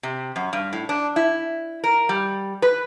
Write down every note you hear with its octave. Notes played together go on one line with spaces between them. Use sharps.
C3
F#2
G2
A2
D4
E4
A#4
G3
B4